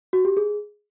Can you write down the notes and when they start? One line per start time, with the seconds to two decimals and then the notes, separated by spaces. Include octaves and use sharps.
0.13 F#4
0.25 G4
0.37 G#4